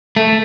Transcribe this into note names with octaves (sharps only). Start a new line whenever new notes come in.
A3